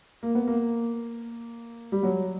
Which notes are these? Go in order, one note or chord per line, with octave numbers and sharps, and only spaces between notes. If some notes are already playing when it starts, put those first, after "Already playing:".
A#3
B3
A#3
G3
F#3